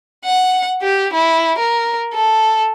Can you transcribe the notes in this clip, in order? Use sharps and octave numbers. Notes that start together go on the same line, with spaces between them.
F#5
G4
E4
A#4
A4